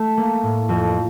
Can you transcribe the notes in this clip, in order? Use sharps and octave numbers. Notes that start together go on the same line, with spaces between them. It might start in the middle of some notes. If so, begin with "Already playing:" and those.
Already playing: A3
A#3
A2
F2